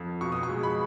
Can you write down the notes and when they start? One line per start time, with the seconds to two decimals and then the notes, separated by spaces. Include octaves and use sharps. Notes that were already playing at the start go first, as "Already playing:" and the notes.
Already playing: F2
0.21 B2 C#6
0.32 D#6
0.43 C#6
0.49 G#3
0.63 B5